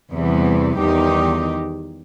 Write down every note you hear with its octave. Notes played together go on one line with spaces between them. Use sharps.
E2 C3 E3 G3 B3
E2 D#3 G3 D#4 G4